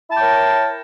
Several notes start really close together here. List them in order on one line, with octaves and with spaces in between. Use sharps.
E4 A5 G5 C#5 A#4